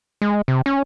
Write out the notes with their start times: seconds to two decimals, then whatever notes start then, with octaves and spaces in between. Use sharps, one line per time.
0.22 G#3
0.48 C3
0.66 C#4